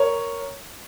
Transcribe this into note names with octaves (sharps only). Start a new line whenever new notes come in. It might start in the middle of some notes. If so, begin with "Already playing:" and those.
Already playing: A#4 C#5